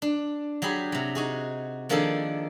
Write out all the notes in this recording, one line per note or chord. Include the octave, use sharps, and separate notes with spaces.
D4
F#3 G4 G#4 B5
C3 F#3
D#4 F#4 G#4
D#3 F3 A#3 D4 G#4 A4